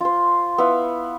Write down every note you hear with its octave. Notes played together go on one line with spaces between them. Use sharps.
F4 C5
B3 E4 F5